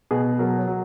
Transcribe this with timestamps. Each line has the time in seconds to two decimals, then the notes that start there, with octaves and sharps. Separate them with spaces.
0.11 B2 G#4
0.39 F#3 A#4
0.58 C#5
0.67 F#3